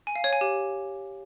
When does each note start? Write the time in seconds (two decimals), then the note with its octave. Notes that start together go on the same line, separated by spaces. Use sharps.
0.07 G#5
0.16 F5
0.24 C#5
0.33 G#5
0.41 G4